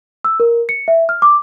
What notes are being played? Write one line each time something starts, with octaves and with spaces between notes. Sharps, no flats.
E6
A#4
C#7
E5
F6
D6